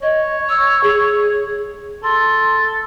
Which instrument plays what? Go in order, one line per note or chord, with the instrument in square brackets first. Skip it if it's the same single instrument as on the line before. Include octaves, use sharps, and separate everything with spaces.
[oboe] C#5 [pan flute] D#5
[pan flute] E6
G#4
[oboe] A4 [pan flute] C6